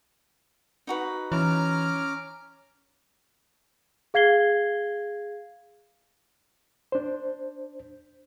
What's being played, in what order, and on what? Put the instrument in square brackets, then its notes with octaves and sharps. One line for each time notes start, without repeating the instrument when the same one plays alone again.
[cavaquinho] D#4 F#4 B4
[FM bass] E3 [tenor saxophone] C#4 [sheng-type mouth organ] A#5 D6 F6
[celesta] G#4 F5 G#6 C7 G7
[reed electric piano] D4 C5